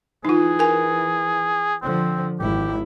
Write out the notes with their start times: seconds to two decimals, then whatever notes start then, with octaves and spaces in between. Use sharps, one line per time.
0.25 E3 D#4 F4 G#4
0.59 A#4 G#5
1.83 D3 F3 C4
2.40 G#1 E4 G4